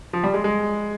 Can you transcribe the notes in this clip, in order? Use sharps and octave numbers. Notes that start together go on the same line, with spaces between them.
F3
G3
G#3
G#3